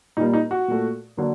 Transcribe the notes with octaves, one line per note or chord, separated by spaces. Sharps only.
A#2 G3 A#3 D#4
D#4
F#4
A#2 A3
D3 F#3 A#3